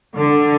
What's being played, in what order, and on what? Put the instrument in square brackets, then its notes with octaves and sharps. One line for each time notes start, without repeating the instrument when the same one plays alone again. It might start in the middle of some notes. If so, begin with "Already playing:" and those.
[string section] D3